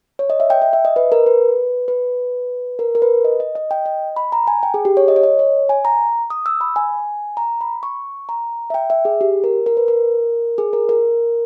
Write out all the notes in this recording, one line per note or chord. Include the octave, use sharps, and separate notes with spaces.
C#5
D#5
E5
G5
E5
E5
D#5
B4
A#4
B4
B4
A#4
A#4
B4
D#5
D#5
D#5
G5
D#5
B5
A#5
G#5
G5
G#4
G4
C#5
D#5
C#5
D#5
C#5
G#5
A#5
D#6
E6
B5
G#5
A#5
B5
C#6
A#5
E5
G5
E5
G#4
G4
A#4
A#4
B4
A#4
G#4
A#4
A#4